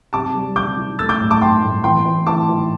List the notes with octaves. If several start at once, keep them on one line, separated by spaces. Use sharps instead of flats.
C3 A5 D6
G3
C3 D6 G6
E4
A3 E6 A6
D6 G6
A2
A5 D6
A2 G5 C6
A2
E3 G5 C6
E3
E3 A5 D6
E3